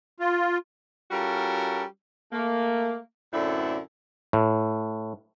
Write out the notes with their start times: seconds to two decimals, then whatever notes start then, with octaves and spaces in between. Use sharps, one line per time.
0.20 F4
1.11 G3 C#4 F4 F#4 A4 A#4
2.32 A3 A#3
3.33 F#2 A2 D3 C4 D4 E4
4.33 A2